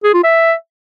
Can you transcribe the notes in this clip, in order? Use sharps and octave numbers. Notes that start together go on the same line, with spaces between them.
G#4
F4
E5